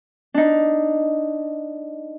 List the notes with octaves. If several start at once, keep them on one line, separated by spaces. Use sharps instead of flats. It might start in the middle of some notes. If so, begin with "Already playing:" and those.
D4 D#4